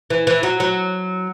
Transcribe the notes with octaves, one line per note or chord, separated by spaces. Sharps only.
E3
E3
F#3
F#3